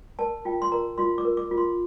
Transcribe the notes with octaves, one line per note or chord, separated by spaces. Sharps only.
A#4 A5
F4 G5
C6
A#4 A#5
F4 C6
D6
A#4
D6
F4
C6